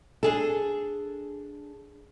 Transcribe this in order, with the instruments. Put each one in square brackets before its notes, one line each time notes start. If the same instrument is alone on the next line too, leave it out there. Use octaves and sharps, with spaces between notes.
[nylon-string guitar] D4 G#4 A4